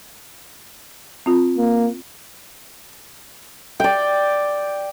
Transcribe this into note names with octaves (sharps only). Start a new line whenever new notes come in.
C4 F4
A#3
D5 G5